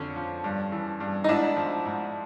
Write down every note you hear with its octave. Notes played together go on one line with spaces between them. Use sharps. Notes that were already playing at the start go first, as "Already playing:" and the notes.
Already playing: F2 D3 C#4
F3
G2
E3
G2
D#4
G#2 D4 E4
F3
G#2